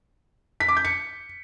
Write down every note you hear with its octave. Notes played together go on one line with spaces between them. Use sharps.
B6
D6
G6
C#7